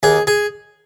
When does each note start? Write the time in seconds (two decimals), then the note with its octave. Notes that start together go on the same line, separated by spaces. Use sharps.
0.03 D#2 G#4
0.27 G#4